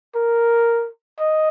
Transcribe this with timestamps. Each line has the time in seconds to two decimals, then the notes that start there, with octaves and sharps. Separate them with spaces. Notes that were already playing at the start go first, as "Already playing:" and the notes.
0.15 A#4
1.19 D#5